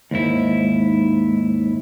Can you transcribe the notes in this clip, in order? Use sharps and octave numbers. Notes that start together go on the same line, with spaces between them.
D#2 G#2 E4